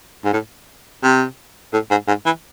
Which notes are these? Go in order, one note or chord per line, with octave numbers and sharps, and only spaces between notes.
G#2
A2
C3
A2
G#2
G#2
E3